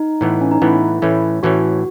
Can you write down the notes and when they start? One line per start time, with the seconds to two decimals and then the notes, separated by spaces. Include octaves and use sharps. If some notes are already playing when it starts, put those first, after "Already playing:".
Already playing: D#4
0.21 A2 E3 B3
0.42 C#4
0.51 D#4
0.62 A2 E3 B3 E4
1.02 A2 E3 A3 C#4
1.43 A2 E3 A3 C#4 F#4